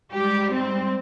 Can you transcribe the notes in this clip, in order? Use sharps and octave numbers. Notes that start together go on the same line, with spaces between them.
G#2 G3 G4
C4